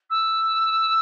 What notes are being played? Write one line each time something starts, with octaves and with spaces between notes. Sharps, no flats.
E6